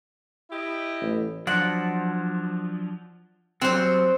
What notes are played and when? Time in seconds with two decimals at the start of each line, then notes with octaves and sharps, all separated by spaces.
0.50 E4 G4 D#5
1.01 A1
1.47 F3 F#3 D4 F#5
3.61 F#3 G3 C4 C5